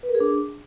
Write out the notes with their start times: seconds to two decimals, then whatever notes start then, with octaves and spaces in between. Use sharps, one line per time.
0.03 B4
0.09 A#4
0.15 G#4
0.20 D4